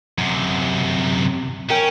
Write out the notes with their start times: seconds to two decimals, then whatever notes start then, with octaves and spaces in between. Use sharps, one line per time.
0.18 F#2 C3
1.70 C#4 A#4 G5